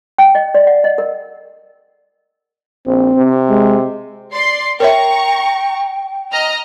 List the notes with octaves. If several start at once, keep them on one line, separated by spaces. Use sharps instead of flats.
G5
D#5
D5
F#5
D#5
A#4
A#1 C4
C3
G#3
D5 C6 C7
A#4 C#5 E5 G5 A#5 C#6
D#5 A#5 F6